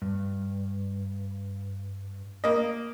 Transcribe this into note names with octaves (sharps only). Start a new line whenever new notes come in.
G2
A#3 D#5